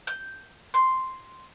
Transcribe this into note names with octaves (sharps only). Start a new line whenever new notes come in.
G6
C6